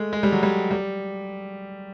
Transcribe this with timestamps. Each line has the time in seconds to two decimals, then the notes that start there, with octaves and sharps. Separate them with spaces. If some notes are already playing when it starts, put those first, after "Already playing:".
Already playing: G#3 A3
0.13 G#3
0.23 G3
0.32 F#3
0.43 G3
0.71 G3